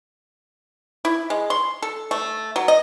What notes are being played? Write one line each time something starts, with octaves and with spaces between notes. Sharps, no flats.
E4
G#3
C6
A4
A3
F#3
D#5